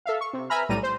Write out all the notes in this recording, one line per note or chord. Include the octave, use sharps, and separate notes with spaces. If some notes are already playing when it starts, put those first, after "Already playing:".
A4 E5 F5
C#6
C3
B4 E5 G#5 A#5 B5 F6
B1 A2 G3 A#5 D#7
C5